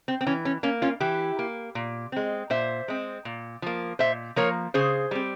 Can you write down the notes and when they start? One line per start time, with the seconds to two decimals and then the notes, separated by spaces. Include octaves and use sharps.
0.08 C4
0.21 C4
0.27 E3 C#4
0.45 C#4
0.63 A#3 C#4
0.82 C#4 F4
1.00 E3 E4 G4
1.39 A#3
1.75 A#2
2.12 G#3 C4
2.50 A#2 C5 E5
2.88 G#3 C4
3.25 A#2
3.62 F3 A#3
3.99 A#2 C5 E5
4.36 F3 A#3 A#4 C#5
4.74 C#3 G#4 C5
5.11 G3 C4